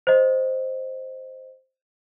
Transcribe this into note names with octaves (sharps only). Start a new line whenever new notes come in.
C5 D#5